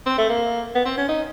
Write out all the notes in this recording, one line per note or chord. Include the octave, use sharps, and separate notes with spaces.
C4
A3
A#3
B3
C4
C#4
D#4